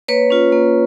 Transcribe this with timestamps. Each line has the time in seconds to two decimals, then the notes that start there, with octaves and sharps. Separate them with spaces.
0.08 A#3 B4 C#5
0.30 C#4 F4
0.52 A#3